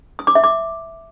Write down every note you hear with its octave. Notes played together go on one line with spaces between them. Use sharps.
D#6
D6
E5
D6